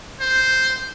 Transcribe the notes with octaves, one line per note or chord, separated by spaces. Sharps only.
C5